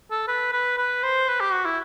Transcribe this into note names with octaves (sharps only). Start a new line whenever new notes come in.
A4
B4
B4
B4
C5
B4
G4
F#4
E4